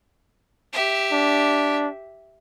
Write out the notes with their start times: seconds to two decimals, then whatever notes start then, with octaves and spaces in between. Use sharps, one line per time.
0.73 G4 E5
1.12 D4